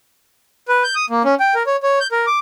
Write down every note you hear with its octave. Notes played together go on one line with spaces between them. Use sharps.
B4
G6
D#6
A#3
C#4
G5
A#4
C#5
C#5
G6
A#4
D6